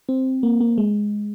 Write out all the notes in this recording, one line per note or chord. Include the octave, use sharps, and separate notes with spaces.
C4
A#3
A#3
G#3